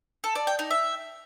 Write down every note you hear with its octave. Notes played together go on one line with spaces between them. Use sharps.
A4
D5
G5
D#4
E5